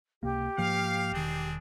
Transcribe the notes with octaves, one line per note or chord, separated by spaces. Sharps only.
C#2 C3 A#3 G4
G#2 F3 A#3 F5
E1 D#3 C4 D4 G#4